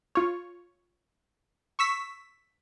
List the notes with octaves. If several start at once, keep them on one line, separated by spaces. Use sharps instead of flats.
F4 C#5
C#6 E6 B6